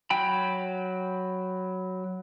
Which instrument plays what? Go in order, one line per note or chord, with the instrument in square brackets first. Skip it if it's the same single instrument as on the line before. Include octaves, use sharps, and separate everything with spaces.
[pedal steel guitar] F#3 G5 B5